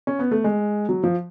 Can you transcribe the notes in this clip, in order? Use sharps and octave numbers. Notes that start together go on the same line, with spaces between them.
C#4
B3
A3
G#3
F#3
F3